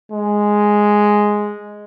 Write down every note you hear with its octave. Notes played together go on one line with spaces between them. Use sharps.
G#3